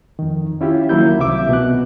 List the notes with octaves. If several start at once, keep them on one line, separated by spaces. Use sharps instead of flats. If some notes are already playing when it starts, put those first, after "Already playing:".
F2 D#3
C#4 E4 F4 G4
D#3 F#3 A#3 E4 G6
C2 C3 E5 D6
B2 F#4 F#6